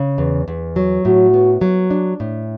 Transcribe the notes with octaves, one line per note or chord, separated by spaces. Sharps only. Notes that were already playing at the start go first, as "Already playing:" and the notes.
Already playing: C#3
E2
E2
F#3
A2 F#4
B3
F#3
D4
A2